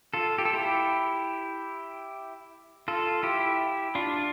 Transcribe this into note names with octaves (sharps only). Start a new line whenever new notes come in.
F4 A4
G4
A4
E4 G4
F4 A4
E4 G4
D4 F4